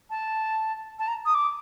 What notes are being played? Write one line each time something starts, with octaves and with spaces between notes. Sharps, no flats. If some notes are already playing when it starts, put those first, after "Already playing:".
A5
A5
A#5
D#6
D6